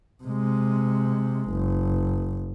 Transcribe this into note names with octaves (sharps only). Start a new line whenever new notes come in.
C3 G#3
F#1